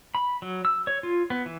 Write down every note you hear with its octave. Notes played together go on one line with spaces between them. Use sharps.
B5
F#3
E6
C#5
F4
B3
E3